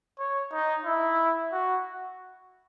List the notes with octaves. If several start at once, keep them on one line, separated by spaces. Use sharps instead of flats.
C#5
D#4
E4
F#4